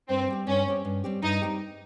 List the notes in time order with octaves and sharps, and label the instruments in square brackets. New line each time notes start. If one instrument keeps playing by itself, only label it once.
[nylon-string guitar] G2 [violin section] C4
[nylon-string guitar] G3 C4 G4
[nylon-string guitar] G2 [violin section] C#4
[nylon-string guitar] G3 C4 G4
G2
G3 C4 G4
[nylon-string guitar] G2 [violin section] D#4
[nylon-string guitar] G3 C4 G4